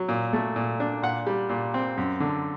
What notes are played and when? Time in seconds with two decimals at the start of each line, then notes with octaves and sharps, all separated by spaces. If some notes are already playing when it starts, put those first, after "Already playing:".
Already playing: F#3
0.09 A#2
0.33 A3
0.56 A#2
0.80 D4
1.02 A#2 F#5
1.27 G3
1.49 A#2
1.74 C4
1.97 F#2
2.20 D3